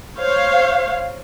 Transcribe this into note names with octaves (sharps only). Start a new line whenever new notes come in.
C5 C#5 F5